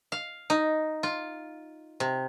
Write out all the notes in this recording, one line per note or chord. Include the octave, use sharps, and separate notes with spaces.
F5
D#4
F4
C3